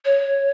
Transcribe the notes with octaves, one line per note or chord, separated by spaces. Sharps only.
C#5